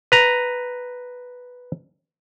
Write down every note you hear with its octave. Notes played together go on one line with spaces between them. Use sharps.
B4 A#5